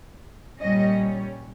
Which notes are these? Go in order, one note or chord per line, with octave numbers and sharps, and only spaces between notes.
A#2 G3 C#4 D#5